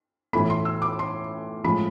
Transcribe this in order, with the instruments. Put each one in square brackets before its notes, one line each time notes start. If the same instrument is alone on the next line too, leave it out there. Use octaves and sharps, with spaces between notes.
[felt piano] A2 E3 A3 B5
C6
E6
D6
C6
A2 F3 G#3 B5